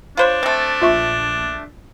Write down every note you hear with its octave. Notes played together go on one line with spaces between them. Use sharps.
D4 F4 C5 C#5
A3 C4
A#1 F4 E5 C#6